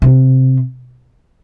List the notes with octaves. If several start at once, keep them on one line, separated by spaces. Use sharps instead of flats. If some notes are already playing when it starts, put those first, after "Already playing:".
C3